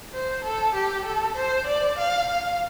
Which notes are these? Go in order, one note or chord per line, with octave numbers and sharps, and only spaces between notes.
C5
A4
G4
A4
C5
D5
F5
F5